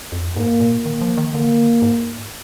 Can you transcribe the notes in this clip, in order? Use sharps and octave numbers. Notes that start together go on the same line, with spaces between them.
F2
G#2 A#3
A#2
D#3 A#3
F3
D#3
D3 A#3
G#2